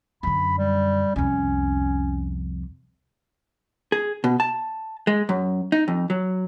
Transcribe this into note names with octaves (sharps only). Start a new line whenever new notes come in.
F#2 D3 B5
G3
C2 F2 C#4
G#4
B2
A5
G#3
F#2
D#4
F2
F#3